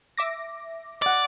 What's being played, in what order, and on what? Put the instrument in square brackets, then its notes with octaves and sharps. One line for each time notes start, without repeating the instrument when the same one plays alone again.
[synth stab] E5 D6 A#6
[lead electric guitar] D5 [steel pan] D#5 F#5